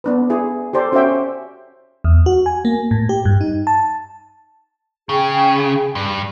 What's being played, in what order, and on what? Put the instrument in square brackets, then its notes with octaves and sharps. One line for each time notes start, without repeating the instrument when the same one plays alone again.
[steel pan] B3 D4 B4
E4 G#4
G4 A4 C5 D5
C#4 F#4 C5 D5 E5 G5
[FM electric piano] E2
F#4
G#5
A#3
A2
G4
G2
D#4
A5
[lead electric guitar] C#3 [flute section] G#4 G5
[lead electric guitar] G2